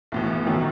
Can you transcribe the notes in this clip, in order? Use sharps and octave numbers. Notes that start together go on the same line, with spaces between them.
B1 A2 E3
G1 F#2 D#3 F#3 B3